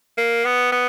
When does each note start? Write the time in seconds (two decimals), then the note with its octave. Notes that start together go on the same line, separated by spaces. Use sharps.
0.18 A#3
0.45 B3
0.72 B3